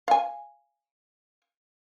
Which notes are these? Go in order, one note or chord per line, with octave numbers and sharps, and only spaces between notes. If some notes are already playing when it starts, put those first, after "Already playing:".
F5 G#5